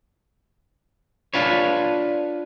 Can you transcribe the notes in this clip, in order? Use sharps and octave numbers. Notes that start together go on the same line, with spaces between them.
D4 F4 B4 C#5